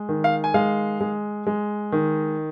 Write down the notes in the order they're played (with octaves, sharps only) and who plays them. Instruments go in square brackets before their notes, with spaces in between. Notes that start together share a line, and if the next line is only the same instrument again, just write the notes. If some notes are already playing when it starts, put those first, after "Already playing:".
Already playing: [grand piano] G#3
D#3
F5
G#5
G#3 F5
G#3
G#3
D#3